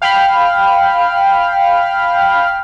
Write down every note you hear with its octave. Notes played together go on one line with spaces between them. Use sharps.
F5 G5 B5 F6